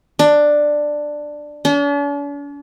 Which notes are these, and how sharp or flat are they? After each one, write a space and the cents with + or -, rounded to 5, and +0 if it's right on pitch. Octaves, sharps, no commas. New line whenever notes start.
D4 +10
D4 -45